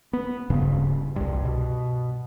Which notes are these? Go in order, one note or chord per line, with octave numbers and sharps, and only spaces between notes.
B3
D1 G2 C#3
C2 G2
B2